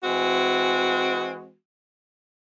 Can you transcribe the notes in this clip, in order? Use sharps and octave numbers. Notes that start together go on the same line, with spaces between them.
E3 G#3 C4 F#4